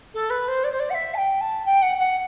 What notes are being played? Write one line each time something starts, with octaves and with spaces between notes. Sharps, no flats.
A4
B4
C5
D5
C5
D5
F#5
E5
A5
G5
A5
G5
F#5
F#5